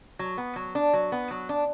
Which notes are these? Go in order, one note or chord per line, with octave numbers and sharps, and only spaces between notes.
F#3
B3
F#3
D4
F#3
B3
F#3
D4